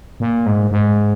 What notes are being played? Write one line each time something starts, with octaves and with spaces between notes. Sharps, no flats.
A#2
G#2
G#2